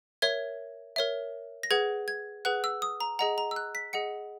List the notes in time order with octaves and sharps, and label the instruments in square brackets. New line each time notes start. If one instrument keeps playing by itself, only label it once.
[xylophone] A#4 C#5 E5 G#6
A#4 C#5 E5
A#6
G#4 B4 F#5 G#6
G#6
G#4 B4 F#5 F#6
E6
D#6
A#5
G#4 D#5 F#5 A#5
A#5
E6
F#6
B6
G#4 D#5 F#5 C#7